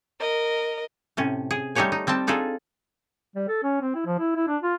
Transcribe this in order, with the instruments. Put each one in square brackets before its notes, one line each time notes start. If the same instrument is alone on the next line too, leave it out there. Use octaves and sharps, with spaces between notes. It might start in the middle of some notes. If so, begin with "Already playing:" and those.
[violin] A#4 D#5
[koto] A2 C3 C#4
G#4
G3 A3 D#4 G4 C#5 G#5
D#4
G3 C4 G5 A5
D4 D#4 F4 G#4 A4
[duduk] G3
A4
C#4
C4
E4
F3
E4
E4
D4
F4